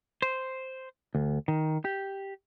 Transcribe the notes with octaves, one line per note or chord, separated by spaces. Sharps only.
C5
D2
D#3
G4